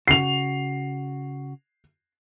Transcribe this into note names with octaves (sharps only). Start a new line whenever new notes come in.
C#3 F#4 C7 F7